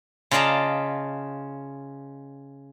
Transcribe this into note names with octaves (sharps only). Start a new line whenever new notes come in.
C#3 F4 D5 D#5 A5 A#5